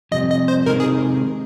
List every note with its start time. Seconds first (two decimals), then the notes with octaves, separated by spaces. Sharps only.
0.12 F2 C3 G3 D#5
0.30 D#5
0.48 C5
0.66 C3 D#3 G#3 D#4 A#4
0.80 G#4